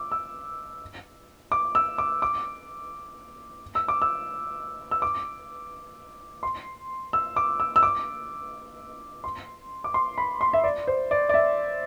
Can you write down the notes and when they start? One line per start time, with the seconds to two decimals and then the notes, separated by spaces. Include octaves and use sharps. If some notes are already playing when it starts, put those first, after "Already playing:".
Already playing: D6 E6
0.12 E6
1.52 D6
1.75 E6
1.98 D6
2.22 D6
3.75 E6
3.88 D6
4.02 E6
4.91 E6
5.02 D6
6.43 C6
7.13 E6
7.36 D6
7.60 E6
7.76 E6
7.83 D6
9.24 C6
9.84 D6
9.94 C6
10.18 B5
10.41 C6
10.53 E5
10.64 D5
10.87 C5
11.11 D5
11.29 D5
11.34 E5